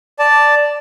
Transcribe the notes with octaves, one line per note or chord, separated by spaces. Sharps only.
D5 A5